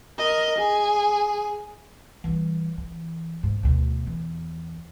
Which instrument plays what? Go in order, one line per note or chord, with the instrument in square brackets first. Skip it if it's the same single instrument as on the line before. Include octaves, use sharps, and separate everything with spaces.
[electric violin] A#4 D#5
G#4
[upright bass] E3 G3
E3
G#2
D2 B2
E2